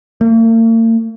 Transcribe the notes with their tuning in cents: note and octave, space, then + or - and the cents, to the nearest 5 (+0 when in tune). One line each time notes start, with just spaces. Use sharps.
A#3 -45